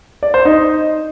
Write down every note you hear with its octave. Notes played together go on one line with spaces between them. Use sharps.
D5
C5
D#4